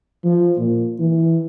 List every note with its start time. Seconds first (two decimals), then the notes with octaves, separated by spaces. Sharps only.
0.24 F3
0.58 A#2
0.99 E3